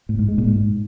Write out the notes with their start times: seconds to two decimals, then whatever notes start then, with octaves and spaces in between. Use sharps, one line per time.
0.09 A2
0.19 G#2
0.28 G#3
0.38 A#2
0.48 G#2